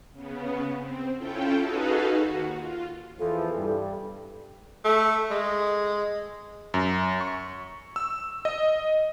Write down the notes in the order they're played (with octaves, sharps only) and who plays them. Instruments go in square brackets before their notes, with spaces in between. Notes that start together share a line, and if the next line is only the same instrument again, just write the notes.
[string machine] C#3 B3
C4
C#4 E4 F4 A4 G5
D#4 F#4 G#4 A4 B4 F5
D#2 F#4
F4
[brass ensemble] E2 E3 F3 [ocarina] A4
[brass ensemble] G2 G3
[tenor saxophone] A3
G#3
[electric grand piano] F#2
C#6
E6
D#5